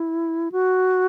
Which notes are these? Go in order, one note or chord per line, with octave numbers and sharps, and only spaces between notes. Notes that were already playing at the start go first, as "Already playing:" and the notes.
Already playing: E4
F#4